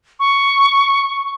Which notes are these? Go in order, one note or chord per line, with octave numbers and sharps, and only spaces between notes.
C#6